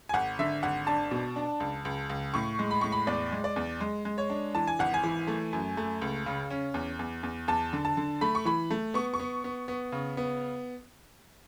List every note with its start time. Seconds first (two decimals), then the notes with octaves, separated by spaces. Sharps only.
0.09 G#5
0.14 G#1 F#5
0.39 D3 E5
0.63 G#1 F#5
0.87 D4 A5
1.11 B2
1.36 D4
1.60 C#2
1.85 C#2
2.10 C#2
2.34 A2 C#6
2.59 G#3
2.71 B5
2.81 A2 C#6
2.92 B5
3.07 E2 D5
3.32 G#3
3.44 D5
3.56 E2
3.81 G#3
4.05 G#3
4.18 C#5
4.30 D4
4.55 E3 A5
4.67 G#5
4.79 G#1 F#5
4.94 G#5
5.03 E3
5.27 A3
5.53 F#2
5.77 A3
6.02 C#2
6.26 C#3
6.50 C#4
6.74 E2
6.99 E2
7.23 E2
7.48 E2 A5
7.73 D3
7.85 A5
7.97 D3
8.21 A3 B5
8.35 C#6
8.45 E3 B5
8.70 A3
8.94 B3 C#6
9.14 C#6
9.20 B3
9.44 B3
9.68 B3
9.92 C#3
10.17 B3